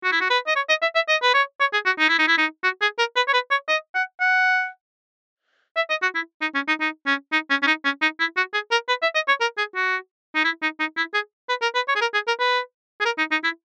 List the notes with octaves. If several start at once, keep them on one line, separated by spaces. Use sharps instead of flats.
F#4
E4
F#4
B4
D#5
C#5
D#5
E5
E5
D#5
B4
C#5
C#5
G#4
F#4
D#4
E4
D#4
E4
D#4
F#4
G#4
A#4
B4
C#5
B4
C#5
D#5
F#5
F#5
E5
D#5
F#4
E4
D#4
C#4
D#4
D#4
C#4
D#4
C#4
C#4
D#4
C#4
D#4
E4
F#4
G#4
A#4
B4
E5
D#5
C#5
A#4
G#4
F#4
D#4
E4
D#4
D#4
E4
G#4
B4
A#4
B4
C#5
G#4
A#4
G#4
A#4
B4
G#4
A#4
D#4
D#4
E4